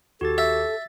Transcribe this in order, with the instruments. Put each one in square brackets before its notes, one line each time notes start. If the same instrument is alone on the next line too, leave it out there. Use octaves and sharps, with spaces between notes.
[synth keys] D#2 [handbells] F#4 G4 A6 [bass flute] A4
[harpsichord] E5 [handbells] A6